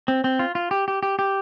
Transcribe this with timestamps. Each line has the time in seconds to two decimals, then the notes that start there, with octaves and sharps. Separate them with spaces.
0.08 C4
0.24 C4
0.39 F4
0.55 F4
0.71 G4
0.88 G4
1.03 G4
1.19 G4